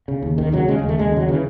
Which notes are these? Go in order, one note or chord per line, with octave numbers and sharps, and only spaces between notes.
C#3
D#2
D#2 D#3
C#3 F#3
C#3 G#3
G#3
D#2
A3
D#2 G#3
C#3 F#3
C#3 E3